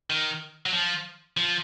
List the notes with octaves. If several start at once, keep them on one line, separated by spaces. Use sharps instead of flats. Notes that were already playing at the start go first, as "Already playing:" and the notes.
D#3
F#3
F3
F3